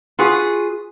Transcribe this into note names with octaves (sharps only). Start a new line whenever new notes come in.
F4 F#4 G#4 B4